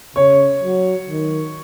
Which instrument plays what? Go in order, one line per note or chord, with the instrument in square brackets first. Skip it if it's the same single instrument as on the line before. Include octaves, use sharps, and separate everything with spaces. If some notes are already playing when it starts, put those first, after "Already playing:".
[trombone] C#3 [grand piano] C#5
[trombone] F#3
D#3